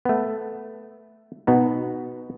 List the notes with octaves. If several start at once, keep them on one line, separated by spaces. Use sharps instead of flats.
A3 B3
B2 B3 D#4